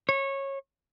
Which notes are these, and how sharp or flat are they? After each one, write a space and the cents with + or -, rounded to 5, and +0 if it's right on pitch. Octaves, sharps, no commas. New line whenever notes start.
C#5 -20